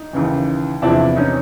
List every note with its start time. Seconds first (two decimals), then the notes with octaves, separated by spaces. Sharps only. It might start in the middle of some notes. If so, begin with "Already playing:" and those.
Already playing: D#4
0.13 D#2 C#3 E3
0.82 E2 C3 F3 D4 E4
1.16 C#4 D#4